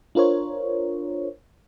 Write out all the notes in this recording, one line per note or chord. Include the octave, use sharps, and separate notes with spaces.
D4 F4 A#4 C5 C#5